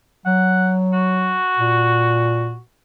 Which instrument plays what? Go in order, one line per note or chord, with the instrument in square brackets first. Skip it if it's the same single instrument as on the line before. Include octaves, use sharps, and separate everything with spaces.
[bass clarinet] F#3 [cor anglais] F#5
[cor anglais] F#4
[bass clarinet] A#2